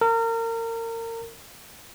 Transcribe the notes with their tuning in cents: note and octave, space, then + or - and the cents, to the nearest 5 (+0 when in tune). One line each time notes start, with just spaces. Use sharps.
A#4 -30